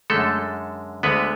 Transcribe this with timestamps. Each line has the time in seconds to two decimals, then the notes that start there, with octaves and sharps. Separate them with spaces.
0.10 F#2 D3 G#3 A3 A4
1.03 D2 D3 G#3 B3 B4